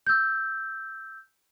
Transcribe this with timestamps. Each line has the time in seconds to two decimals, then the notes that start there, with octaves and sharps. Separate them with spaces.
0.07 E6 G6